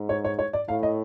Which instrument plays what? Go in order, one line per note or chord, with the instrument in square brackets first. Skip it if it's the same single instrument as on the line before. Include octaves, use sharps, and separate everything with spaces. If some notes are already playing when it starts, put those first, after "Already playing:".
Already playing: [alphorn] G#2
[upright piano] C#5
C#5
C#5
D5
[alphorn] A2 [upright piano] F5
[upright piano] D#5